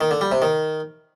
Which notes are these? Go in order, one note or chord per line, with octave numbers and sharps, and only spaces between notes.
D#3
D3
G3
C3
D#3